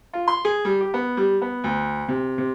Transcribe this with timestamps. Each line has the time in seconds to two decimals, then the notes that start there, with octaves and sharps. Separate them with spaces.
0.13 F4
0.28 C6
0.45 G#4
0.65 G3
0.81 G4
0.94 B3
1.17 G3
1.42 B3
1.64 D2
2.08 C3
2.38 C3